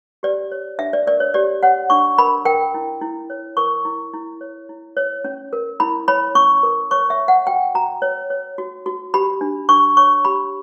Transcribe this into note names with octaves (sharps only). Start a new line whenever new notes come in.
G4 D5
C#5
D4 E5
D5
A#4 D5
C#5
G4 D5
C#5 F#5
D4 C#6
A#4 B5
A#4 G5
E4
E4
C#5
A#4 C#6
E4
E4
C#5
E4
C#5
C#4
A#4
E4 B5
C#5 B5
C#4 C#6
A#4
C#5 C#6
E5
C#5
F#5
F#4 G5
F#4 A#5
C#5
C#5
F#4
F#4
G4 B5
D4
D4 C#6
C#5 C#6
G4 B5